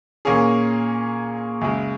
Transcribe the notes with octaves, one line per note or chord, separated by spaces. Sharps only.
A#2 A#3 C#4 G#4
F#2 C#3 G#3